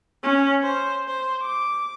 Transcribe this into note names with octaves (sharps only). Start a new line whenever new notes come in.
C#4
C5
C5
D6